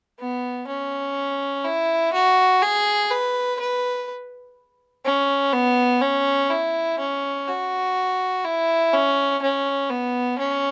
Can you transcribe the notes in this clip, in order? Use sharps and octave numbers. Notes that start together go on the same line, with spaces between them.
B3
C#4
E4
F#4
G#4
B4
B4
C#4
B3
C#4
E4
C#4
F#4
E4
C#4
C#4
B3
C#4